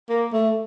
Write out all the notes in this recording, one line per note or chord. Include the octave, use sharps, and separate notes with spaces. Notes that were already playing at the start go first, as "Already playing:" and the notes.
A#3
A3